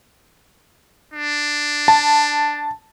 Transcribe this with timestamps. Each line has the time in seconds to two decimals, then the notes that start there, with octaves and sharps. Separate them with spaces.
1.14 D4
1.88 A5